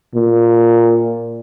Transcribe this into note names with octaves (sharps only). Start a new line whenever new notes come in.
A#2